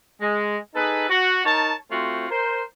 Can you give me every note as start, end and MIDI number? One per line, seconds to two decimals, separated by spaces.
0.21 0.57 56
0.74 1.08 63
0.74 1.08 68
0.74 1.08 69
0.74 1.08 71
1.09 1.42 66
1.45 1.74 63
1.45 1.74 70
1.45 1.74 73
1.45 1.74 81
1.91 2.26 57
1.91 2.26 60
1.91 2.26 65
1.91 2.26 66
1.91 2.26 72
2.30 2.63 70
2.30 2.63 72